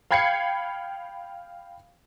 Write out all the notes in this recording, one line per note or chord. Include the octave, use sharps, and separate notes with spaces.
F5 G5 B5 G#6 C7 C#7